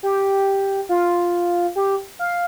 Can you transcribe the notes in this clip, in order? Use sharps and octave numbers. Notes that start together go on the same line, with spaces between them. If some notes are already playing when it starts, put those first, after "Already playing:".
G4
F4
G4
F5